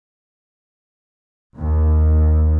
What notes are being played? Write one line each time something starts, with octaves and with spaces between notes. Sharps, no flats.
D#2